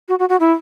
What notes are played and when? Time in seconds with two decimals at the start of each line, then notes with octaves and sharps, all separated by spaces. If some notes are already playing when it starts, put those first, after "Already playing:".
0.08 F#4
0.19 F#4
0.29 F#4
0.40 E4